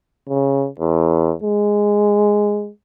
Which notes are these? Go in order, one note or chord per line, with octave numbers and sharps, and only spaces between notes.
C#3
E2
G#3